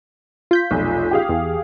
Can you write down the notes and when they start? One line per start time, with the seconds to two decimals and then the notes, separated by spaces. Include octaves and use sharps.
0.51 F4 G6 B6
0.71 F1 B1
1.11 G4 G#4 F5
1.29 E2